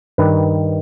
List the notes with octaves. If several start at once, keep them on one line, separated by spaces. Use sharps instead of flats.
G2 D#3 G3 B4